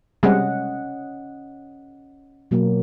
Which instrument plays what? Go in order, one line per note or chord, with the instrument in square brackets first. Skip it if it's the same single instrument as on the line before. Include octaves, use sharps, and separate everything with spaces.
[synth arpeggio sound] C3 G3 G#3 [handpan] C#4 D#5 F#5
[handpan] B2 F#3 A#3